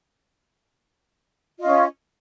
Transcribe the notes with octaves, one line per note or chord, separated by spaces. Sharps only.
C#4 F4 D#5